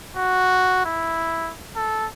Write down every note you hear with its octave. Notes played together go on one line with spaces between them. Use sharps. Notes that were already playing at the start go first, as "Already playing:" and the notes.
F#4
E4
A4